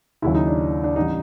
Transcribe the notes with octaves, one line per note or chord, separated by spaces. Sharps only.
D#2 C#3 F#3 E4
D#4
D4
D4
A1 E3 G3 D#4